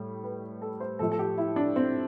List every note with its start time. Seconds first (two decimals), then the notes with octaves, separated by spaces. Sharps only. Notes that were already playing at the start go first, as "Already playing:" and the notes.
Already playing: A2 G3
0.24 B4
0.62 A4
0.80 C5
0.99 A2 F3 A3 A4
1.12 A4
1.19 G4
1.38 E4
1.56 D4
1.76 C4